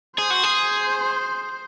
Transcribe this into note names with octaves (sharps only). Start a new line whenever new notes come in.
G#4 C5
F#4
G#4